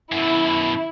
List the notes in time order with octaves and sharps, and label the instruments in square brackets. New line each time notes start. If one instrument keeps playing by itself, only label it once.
[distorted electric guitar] F#2 B2 [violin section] E4